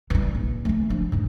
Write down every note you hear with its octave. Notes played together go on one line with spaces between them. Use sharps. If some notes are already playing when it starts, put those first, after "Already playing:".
E3 G3
A#1
E3 A3
F3 D4
G#2 E3